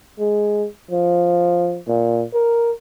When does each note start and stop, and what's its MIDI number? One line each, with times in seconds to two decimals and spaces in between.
0.19 0.66 56
0.91 1.79 53
1.87 2.24 46
2.33 2.71 70